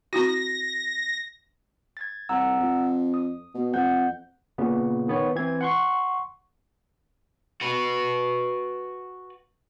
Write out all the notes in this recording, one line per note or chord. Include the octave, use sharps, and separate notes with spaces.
C4 E4 F#4 A#6
G#6 A6
C2 F#5 A#5 E6
F2
D#6
B2
F2 F#5 G6
A#2 C#3 B3
D#3 B3 C#5
E3 C4 G#6
F#5 C6 C#6
F#4 B4